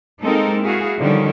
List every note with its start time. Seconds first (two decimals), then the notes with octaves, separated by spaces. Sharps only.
0.20 G#3 A#3 C4 D#4 A4 A#4
0.62 E4 F#4 G#4 F5
1.00 D3 D#3 F3 G3 C#4 D#4